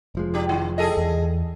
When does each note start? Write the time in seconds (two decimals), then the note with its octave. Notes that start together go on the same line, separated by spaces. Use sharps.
0.15 F1 F3 G#3
0.34 D4 G4
0.49 D#3
0.78 G#4 A4 D#5
0.97 E2